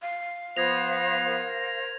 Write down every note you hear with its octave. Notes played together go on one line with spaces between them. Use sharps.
F5
F3 B3 C5 G#6 A#6 F7
A#4 C5